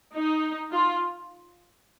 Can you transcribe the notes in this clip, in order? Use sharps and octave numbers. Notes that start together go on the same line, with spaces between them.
D#4
F4